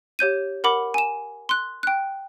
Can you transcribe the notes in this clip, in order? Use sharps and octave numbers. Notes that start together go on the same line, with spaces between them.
G4 C#5 G6 D#7
A#4 F#5 B5 D6
G#5 E7
C6 F#6
G5 F#6